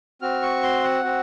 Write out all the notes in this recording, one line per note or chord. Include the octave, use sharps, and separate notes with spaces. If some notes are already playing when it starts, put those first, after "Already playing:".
C4 F#4 F6
C#6
C6
F#5
C4 F#4